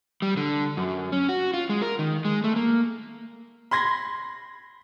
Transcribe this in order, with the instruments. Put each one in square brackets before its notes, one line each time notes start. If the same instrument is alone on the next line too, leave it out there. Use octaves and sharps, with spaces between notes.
[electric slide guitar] G3
D3
F#2
C#4
F#4
F4
G#3
A#4
D#3
G#3
A3
A#3
[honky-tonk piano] B5 C6 G#6 A#6